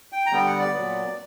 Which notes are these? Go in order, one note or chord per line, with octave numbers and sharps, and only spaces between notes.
G5
A#5
D3 G3 B3 G5
F#5
D5
A#2 F#3 B3